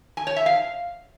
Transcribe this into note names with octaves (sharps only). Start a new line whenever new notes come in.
G#5
C#5
E5
F5